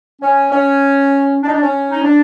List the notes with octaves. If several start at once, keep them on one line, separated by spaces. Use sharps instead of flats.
C#4
C#4
D4
D#4
D4
C#4
D#4
D4